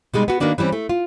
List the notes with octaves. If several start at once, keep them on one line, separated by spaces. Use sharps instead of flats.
B2 G3 G#3 D#4
B3 F#4
D#3 A#3 B3 D4 F#4
E3 G3 C4 C#4
A3
F4